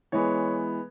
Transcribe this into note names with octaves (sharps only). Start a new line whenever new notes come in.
E3 G#3 B3 C#5